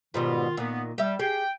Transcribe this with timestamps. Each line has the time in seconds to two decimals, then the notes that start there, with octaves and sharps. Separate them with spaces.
0.14 G#2 B2 D#3 G3 F4
0.57 A#2 D#3 B3
0.98 G3 G4 E5
1.19 G4 G#4 G5